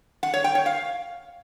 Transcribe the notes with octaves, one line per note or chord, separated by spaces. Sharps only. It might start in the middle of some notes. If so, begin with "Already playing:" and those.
F#5
C#5
G5
C#5
F5